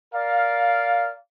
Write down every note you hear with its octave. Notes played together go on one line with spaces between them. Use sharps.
A#4 D5 F5